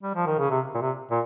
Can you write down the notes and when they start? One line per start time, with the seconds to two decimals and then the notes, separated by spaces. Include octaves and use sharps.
0.03 G3
0.15 F3
0.26 D#3
0.39 C#3
0.50 C3
0.75 A#2
0.81 C3
1.11 A#2